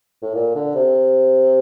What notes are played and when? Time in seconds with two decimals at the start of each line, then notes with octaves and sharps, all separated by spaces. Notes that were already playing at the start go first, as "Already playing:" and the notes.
0.23 A2
0.35 A#2
0.55 D3
0.75 C3